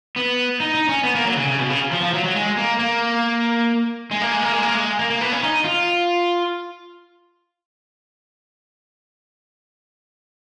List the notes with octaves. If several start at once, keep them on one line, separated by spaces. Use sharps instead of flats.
B3
D#4
D#4
C#4
B3
A#3
F#3
C#3
C#3
B2
C#3
F3
F3
F#3
F#3
G#3
A#3
A#3
G#3
A#3
G#3
A#3
G#3
A#3
G#3
A#3
A#3
B3
C#4
D#4
F4